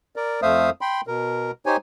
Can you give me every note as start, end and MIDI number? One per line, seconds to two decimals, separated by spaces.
0.16 0.41 70
0.16 0.41 74
0.42 0.70 41
0.42 0.70 57
0.42 0.70 72
0.42 0.70 76
0.42 0.70 77
0.42 0.70 87
0.81 1.01 79
0.81 1.01 83
0.81 1.01 84
1.07 1.51 47
1.07 1.51 70
1.66 1.77 63
1.66 1.77 67
1.66 1.77 72
1.66 1.77 73
1.66 1.77 80